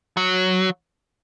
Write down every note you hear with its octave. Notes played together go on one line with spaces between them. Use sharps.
F#3